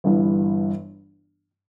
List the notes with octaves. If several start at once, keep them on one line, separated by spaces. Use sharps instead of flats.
G1 G2 E3